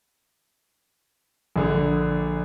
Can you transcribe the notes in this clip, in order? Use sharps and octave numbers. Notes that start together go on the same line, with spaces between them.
A#1 D3